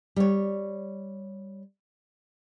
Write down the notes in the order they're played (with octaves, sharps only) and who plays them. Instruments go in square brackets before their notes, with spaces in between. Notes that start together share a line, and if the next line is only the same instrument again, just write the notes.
[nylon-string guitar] G3 C#5